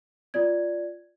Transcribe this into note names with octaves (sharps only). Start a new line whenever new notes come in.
F4 D5 G#6